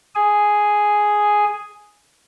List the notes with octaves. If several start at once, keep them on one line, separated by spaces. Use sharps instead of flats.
G#4 G#5